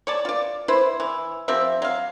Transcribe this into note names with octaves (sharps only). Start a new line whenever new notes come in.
C#5 D5 A5
F4 D5
E4 B4 C5
E3
F3 C4 G4 E5
F#3 F5